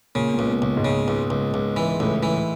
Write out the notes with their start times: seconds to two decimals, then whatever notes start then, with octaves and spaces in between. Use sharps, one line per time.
0.15 A#2 C#3
0.34 C#2 A#2
0.46 B2
0.62 C#2
0.77 G#2
0.85 C#3
1.08 C#2
1.30 C#2
1.54 C#2
1.76 E3
2.00 C#2 A2
2.23 E3